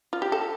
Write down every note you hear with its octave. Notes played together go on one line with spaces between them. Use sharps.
F4
G4
A4